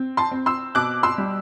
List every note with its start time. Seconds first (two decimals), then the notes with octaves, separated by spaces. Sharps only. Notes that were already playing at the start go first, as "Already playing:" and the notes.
Already playing: C4
0.17 A5 C6
0.31 C4
0.46 C6 E6
0.75 B2 D6 F#6
1.03 C6 E6
1.18 G3